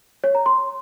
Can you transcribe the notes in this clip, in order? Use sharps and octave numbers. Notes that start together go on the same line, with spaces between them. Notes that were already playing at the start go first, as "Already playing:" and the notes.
C#5
A#5
C6